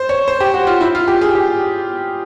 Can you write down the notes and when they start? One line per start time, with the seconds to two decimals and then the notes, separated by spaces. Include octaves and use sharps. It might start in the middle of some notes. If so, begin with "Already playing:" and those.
Already playing: C5
0.09 C#5
0.28 C5
0.40 G4
0.54 F#4
0.67 F4
0.81 E4
0.95 F4
1.08 G4
1.21 G#4
1.35 G4